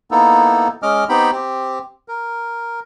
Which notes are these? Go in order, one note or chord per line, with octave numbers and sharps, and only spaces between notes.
A#3 B3 D#4 E4 A4
G#3 C#4 D#5 D6 F6
B3 C4 D#4 G4 G5 B5
C4 G4
A#4